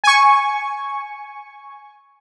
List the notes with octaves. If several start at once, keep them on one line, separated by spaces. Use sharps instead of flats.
G#5 C#6